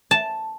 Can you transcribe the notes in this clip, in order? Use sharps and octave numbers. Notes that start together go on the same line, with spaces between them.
A5